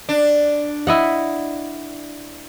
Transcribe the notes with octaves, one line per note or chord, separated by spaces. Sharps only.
D4
E4 D#5 F#5